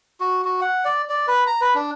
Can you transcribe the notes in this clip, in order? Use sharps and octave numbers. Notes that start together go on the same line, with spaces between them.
F#4
F#4
F#5
D5
D5
B4
A#5
B4
D4